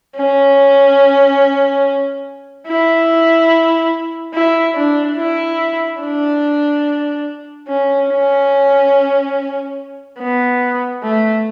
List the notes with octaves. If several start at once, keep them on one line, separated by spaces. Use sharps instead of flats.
C#4
E4
E4
D4
E4
D4
C#4
C#4
B3
A3